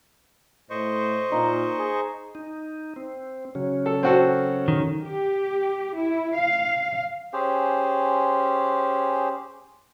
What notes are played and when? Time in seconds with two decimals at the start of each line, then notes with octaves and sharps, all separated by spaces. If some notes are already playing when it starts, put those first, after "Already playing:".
0.70 A2 C5 D#5 C#6
1.32 A#2 D#4
1.79 G#4
2.35 D#4
2.96 C4
3.55 C#3 F#3 C#4
3.86 A4
4.03 C4 F#4 A4
4.68 D#3
5.04 G4
5.96 E4
6.35 F5
7.33 C#4 G4 G#4 C5